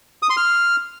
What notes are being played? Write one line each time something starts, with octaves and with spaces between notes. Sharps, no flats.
D#6
C6
F6